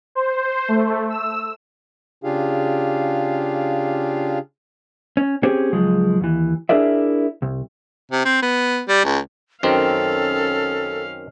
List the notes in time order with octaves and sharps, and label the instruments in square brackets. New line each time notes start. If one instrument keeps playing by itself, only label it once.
[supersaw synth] C5
A3
E6
[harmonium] C#3 D4 F4 G4 G#4 F5
[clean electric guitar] C#4
C4 C#4 G4 G#4 C5 C#5
C#2 F3 F#3 G#3
D#2 E3
D4 E4 G#4 A#4 D5 E5
C2
[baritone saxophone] C3
C4
B3
G3
C#2
[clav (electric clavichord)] F#2 D#3 C4 [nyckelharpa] C#4 F5 [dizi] A4